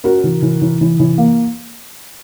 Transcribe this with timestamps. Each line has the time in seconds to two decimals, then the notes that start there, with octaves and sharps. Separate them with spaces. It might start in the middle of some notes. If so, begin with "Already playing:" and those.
0.04 C#4 F#4 A#4
0.24 E3
0.42 E3
0.62 E3
0.81 E3
1.00 E3
1.18 A#3